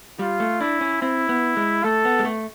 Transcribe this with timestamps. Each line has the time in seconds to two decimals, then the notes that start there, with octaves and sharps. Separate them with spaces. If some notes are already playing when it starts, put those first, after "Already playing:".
0.19 G3 F4
0.40 A3
0.60 D4 E4
0.81 C#4
1.01 C4 E4
1.29 B3
1.57 G#3
1.84 A3 A4
2.05 B3
2.19 G#3
2.25 A3